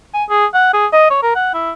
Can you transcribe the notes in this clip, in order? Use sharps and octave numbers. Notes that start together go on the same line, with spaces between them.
G#5
G#4
F#5
G#4
D#5
C#5
A#4
F#5
E4